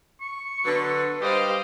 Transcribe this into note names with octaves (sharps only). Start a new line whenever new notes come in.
C#6
D3 F#3 B3 B4
G3 G4 C5 D#5 F5